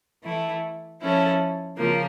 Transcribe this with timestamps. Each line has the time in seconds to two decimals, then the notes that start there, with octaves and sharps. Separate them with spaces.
0.23 E3 A3 E4
1.00 F3 C#4 E4 A4
1.77 C#3 F3 A#3